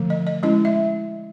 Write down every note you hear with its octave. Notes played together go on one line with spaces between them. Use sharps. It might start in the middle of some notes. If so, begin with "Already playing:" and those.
Already playing: D3 F3 A3
D#5
D#5
G#3 C#4 E4 D#5
E5